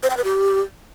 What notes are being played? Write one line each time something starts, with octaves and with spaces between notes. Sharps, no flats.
C5
G5
B4
G4